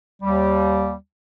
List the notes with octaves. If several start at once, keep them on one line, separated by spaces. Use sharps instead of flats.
D#2 G3